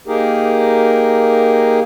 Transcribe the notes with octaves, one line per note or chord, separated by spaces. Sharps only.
A#3 D#4 G4 G#4 A#4